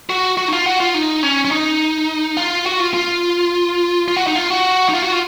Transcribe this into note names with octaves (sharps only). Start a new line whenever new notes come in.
F#4
F#4
D#4
F4
F#4
F4
D#4
C#4
C#4
D#4
F4
F#4
F4
F4
F4
F#4
D#4
F4
F#4
D#4
F4
F#4
F4